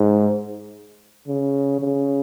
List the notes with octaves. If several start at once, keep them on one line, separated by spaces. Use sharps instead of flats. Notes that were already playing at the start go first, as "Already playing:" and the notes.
Already playing: G#2
C#3
C#3